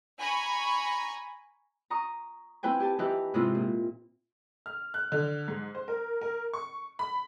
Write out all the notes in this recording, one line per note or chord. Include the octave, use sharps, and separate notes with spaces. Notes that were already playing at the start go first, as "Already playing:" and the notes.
G#5 A#5 B5 C#6
A#5 C#6 D#6
C4 E4 B4 G5 G#5
G4 G#5 A5
E3 D#4 E4 G4 B4
G#2 C3 G#3 C4 E4 F4
A#2
F6
F#6
D3
G#2
C5
A#4
A#4
C#6
B5